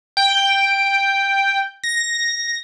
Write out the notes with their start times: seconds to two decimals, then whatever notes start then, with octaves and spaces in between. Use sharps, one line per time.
0.17 G5
1.84 A#6